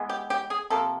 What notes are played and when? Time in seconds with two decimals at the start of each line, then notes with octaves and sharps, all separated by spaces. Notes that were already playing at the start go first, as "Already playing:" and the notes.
Already playing: E3 G#3 B3
0.09 G4
0.30 G4
0.50 G#4
0.70 C3 F3 A#3 A4